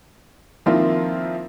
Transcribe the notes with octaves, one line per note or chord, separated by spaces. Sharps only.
D#3 F3 A#3 C4 E4 F4